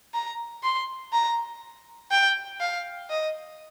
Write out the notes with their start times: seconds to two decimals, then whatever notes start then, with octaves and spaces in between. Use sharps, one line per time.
0.14 A#5
0.63 C6
1.13 A#5
2.11 G5
2.60 F5
3.09 D#5